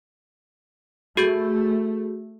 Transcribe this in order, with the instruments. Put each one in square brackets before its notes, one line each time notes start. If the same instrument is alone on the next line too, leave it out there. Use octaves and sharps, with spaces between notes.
[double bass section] A3 [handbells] F#4 G#4 G6